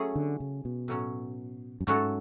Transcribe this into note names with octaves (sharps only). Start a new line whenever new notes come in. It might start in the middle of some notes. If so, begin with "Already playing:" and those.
Already playing: F#3 A3 C#4 G#4
D3
C#3
B2
A2 F#3 C#4
F#2
G#2 F#3 A3 C#4 F#4 A4